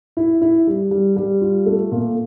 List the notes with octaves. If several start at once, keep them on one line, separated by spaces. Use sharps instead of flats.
E4
E4
G3
G3
G3
F4
A3
A#2